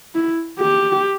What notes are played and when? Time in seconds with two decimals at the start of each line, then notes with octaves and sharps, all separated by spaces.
0.15 E4
0.59 G4